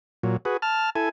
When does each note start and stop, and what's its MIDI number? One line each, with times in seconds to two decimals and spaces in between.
0.23 0.37 46
0.23 0.37 54
0.45 0.57 66
0.45 0.57 68
0.45 0.57 71
0.62 0.90 81
0.62 0.90 89
0.95 1.09 64
0.95 1.09 69
0.95 1.09 80